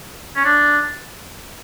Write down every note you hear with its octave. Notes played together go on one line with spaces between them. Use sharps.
C#4
D4